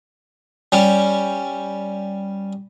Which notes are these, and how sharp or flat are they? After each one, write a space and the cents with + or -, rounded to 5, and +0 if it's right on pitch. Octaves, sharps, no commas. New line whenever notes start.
G3 +0 C#4 +0